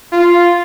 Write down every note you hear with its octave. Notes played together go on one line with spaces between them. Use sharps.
F4